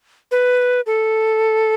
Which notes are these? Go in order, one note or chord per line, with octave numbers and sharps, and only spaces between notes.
B4
A4